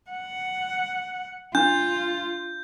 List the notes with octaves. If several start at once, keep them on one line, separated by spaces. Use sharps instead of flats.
F#5
D4 F4 G6